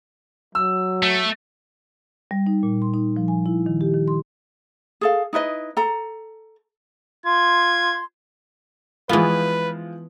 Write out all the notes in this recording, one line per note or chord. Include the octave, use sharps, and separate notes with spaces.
F#3 E6
A3
G3
D#4
A#2
C6
D#4
F3
G#5
E4
D#3
G4
D#3
C6
G#4 A4 F5
D#4 E4 B4 D#5
A4 A#5
F4 C6 G#6
E3 F3 G#3 B3 F4 B4